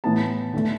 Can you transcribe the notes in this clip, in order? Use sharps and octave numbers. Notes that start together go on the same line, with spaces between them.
A2 E3 B3 A5
D3 A3